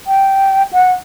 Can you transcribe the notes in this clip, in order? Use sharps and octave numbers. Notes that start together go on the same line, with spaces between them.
G5
F#5